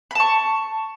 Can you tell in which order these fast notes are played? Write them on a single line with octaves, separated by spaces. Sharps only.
B5 A5 C#6